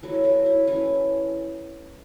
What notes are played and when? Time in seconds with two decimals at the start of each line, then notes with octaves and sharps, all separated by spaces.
0.03 E3 F#3 A3 F#4
0.14 A4
0.24 F#3 F#4
0.46 E4
0.67 E3 A3 C#4